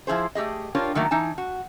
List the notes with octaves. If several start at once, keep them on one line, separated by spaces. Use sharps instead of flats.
F3 E4 G#4 C5
A3 G4 G#4 D#5
D4 F4 G4 A#4 C#5
D#3 F#3 A3 A#3
E3 D#4 G#5 A5
F#4